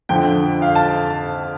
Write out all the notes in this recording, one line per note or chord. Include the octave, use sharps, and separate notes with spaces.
F2 D3 F3 G5
F5
A5